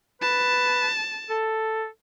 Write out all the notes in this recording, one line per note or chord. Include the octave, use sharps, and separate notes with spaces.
B4 A5
A4